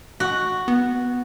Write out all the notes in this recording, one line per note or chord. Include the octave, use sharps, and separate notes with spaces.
F#4
B3